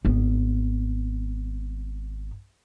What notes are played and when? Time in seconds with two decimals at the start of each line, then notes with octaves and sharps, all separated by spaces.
0.05 G#1 B3